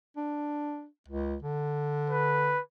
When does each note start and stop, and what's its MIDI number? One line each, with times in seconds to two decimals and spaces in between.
0.17 0.86 62
1.09 1.35 37
1.43 2.57 50
2.10 2.61 71